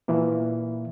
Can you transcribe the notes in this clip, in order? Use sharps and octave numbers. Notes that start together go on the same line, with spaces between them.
A#2 E3 A#3